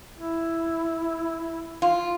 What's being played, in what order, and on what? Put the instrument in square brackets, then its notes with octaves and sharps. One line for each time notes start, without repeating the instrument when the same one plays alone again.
[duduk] E4
[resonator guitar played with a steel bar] F4